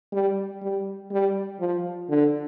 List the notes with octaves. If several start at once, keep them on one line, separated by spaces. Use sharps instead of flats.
G3
G3
G3
F3
D3